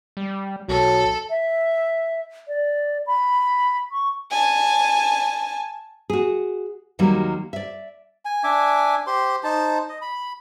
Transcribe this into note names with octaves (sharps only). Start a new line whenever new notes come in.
G3
B1 F#3 A4
E5
D5
B5
C#6
G#5 A5
F#4 G#4
D#2 D#3 F#3 G3 A#3
D5 E5
G#5
D4 E5 G#5 D6
G4 C5 C6
D#4 C5 A5
D#5
B5